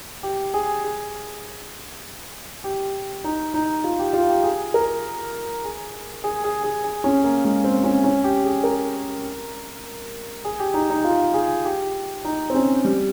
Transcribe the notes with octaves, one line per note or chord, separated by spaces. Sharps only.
G4
G#4
G#4
G4
D#4
D#4
F4
G4
F4
G4
G#4
A#4
G#4
G#4
G#4
G#4
G#4
C#4
A#3
G#3
C4
C#4
C#4
G4
G#4
A#4
G#4
G4
D#4
D#4
F4
G#4
G4
D#4
C4
C#4
G3